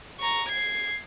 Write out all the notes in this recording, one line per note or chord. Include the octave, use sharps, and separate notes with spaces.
A#5 C#6
G#6 C7